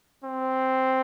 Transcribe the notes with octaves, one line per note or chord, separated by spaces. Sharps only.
C4